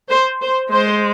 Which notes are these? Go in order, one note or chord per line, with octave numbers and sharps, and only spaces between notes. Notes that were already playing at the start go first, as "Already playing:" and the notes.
C5
C5
G#3 C5